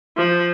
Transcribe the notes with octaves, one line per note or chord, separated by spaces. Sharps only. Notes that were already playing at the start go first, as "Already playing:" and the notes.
F3